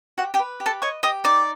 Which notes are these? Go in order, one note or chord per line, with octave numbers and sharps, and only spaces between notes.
F#4 G4 F#5
G4 G5
B4
G4
A4 A5
C#5 D#5 C#6
G4 D#5 D#6
D#4 D5 D6